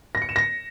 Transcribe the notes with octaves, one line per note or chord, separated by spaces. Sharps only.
A#6
C#7
E7
A#6